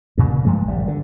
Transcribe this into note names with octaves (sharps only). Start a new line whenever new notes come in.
G2 A#2 C#3
G2 F3 G#3 A3
G#1 G3
D3